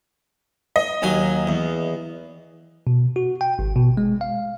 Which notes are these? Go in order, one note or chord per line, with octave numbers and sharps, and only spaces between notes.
D#5
D#2 F#3 G#5
E2
B2
F#4
G5
G#1
B2
G#3
F5